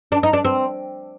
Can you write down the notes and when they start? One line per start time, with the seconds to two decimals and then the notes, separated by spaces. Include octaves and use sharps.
0.12 D4
0.23 D#4
0.33 D4
0.45 C4